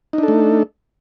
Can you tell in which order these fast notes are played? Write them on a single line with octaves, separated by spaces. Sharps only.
D#4 D4 A4 A3